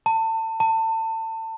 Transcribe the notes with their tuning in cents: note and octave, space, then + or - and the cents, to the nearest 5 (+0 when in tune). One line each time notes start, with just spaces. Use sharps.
A5 +30
A5 +30